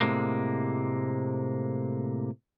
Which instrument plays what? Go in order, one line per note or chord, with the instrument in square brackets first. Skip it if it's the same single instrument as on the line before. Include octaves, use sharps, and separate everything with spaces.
[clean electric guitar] A2 C3 G#3 A#3